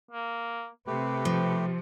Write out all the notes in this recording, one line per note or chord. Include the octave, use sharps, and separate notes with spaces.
A#3
C3 A3 G4 B4
F3